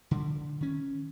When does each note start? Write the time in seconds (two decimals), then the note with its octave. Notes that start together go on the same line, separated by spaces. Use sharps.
0.11 D3
0.61 D#3 C#4